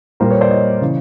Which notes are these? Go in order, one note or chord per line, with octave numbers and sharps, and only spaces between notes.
A#2 G3 A#4 C5
B4 C#5
C5 D5
C#5 D#5
C#3 E3